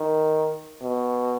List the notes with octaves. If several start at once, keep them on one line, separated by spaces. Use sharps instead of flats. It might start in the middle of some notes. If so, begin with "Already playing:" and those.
Already playing: D#3
B2